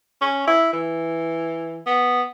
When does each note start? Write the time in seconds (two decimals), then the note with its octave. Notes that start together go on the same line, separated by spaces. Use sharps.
0.21 C#4
0.47 E4
0.73 E3
1.86 B3